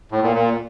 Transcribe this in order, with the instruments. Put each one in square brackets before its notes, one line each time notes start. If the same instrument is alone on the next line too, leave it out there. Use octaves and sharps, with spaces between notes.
[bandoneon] A2
A#2
A#2